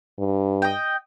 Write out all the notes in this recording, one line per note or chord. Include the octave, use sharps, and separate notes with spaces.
G2
D#5 G5